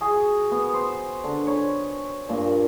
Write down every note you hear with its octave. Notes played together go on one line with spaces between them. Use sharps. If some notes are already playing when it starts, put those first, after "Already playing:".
F#4 G#4
B3
C5
D3
C#5 B5
G2 A#2